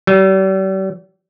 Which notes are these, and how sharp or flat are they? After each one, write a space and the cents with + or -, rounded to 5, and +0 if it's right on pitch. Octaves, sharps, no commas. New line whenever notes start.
G3 -40